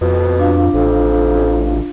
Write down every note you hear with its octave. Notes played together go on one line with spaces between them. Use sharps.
F2 B2
D4 F4 F5
A1 F2